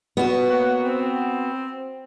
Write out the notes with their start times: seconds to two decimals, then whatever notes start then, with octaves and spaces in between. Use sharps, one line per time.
0.17 B3 F#4
0.49 A#3 C#5 F#5
0.84 C4